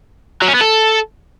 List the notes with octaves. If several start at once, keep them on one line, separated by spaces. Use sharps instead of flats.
F#3
C#4
B3
A4